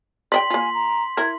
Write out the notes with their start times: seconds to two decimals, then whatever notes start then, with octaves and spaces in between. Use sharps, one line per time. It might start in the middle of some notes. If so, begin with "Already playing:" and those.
0.32 D5 D#5 G5 C6 B6 F#7
0.50 A#3 F4 G#5
0.74 A#5
1.17 E4 A#4 G#6